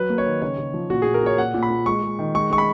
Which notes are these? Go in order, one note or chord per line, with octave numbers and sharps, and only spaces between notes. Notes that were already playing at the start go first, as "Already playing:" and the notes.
Already playing: F#3 B4
A#3
C#5
D#3
C#3 C#5
C#3
F3
A#2 F#4
A#2 G#4
A#4
A#2 C#5
A#2 F#5
A#2
B5
A#2
G#3 C#6
G#3
D#3
G#3 C#6
G#3 C#6
B5